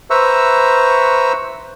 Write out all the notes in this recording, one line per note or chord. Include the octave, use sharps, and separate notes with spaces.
B4 C5 E5 A#5 C#6 E6